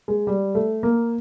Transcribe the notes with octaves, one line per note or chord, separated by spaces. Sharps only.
G#3
G3
A3
A#3